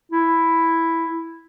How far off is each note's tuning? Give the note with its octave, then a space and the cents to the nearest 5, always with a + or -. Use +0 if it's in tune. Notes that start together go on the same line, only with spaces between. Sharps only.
E4 +0